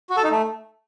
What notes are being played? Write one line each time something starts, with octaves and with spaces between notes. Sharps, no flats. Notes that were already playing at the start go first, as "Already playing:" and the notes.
F#4
A4
D#4
A3